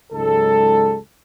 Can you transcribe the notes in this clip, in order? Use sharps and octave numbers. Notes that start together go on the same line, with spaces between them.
C#2 G#2 F#3 G#3 D#4 A4